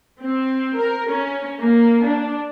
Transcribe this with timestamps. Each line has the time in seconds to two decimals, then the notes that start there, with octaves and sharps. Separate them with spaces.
0.21 C4
0.76 A#4
1.09 C#4
1.60 A#3
2.04 D4